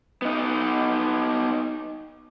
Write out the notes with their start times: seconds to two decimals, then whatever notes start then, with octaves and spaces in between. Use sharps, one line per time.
0.22 B3 D#4